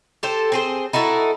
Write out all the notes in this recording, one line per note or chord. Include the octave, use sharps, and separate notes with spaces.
G4 A4 C5
C4 G#4 C5
D#4 E4 F#4 A4